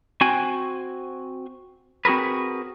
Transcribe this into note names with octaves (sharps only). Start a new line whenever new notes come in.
C4 F#4 G5 G#5
C4 F#4 G#4 A#4 B4